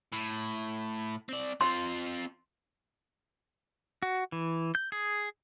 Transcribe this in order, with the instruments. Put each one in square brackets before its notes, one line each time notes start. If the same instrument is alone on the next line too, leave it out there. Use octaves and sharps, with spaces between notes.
[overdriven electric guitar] A2
C4 D5
[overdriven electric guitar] C4 F4 [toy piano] C6
[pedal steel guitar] F#4
E3
G6
G#4